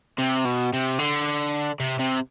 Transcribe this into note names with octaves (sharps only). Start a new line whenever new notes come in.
C3
B2
C3
D3
C3
C3